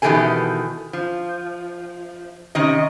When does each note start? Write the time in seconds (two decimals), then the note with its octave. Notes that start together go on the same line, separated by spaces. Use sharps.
0.02 B2 D#3 E3 G4 A4 G#5
0.93 F3
2.55 C3 D#3 C#4 D#5